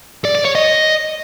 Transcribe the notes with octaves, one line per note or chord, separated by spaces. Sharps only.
D5
D5
C#5
D#5